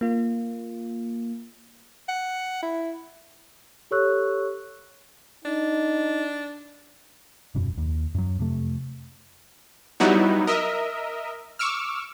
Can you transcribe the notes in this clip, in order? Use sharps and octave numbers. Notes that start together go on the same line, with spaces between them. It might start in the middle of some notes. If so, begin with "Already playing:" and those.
A#3 F4
F#5
E4
G4 A4 C#5 C#6 E6 F#6
D4 D#4
E1 F#2 B2
D#2
F#2 F#3
F2 C3 A3
F#3 G3 B3 D#4 E4 F#4
A#4 D#5 E5
C#6 D6 E6 F6